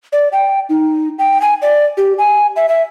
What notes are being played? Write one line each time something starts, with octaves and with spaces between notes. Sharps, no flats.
D5
G5
D#4
G5
G#5
D5
G4
G#5
E5
E5